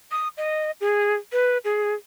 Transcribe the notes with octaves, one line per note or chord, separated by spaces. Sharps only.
D#6
D#5
G#4
B4
G#4